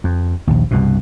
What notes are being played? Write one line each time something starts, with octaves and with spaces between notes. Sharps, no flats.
F2
A#1 D#2
C2 G2 B2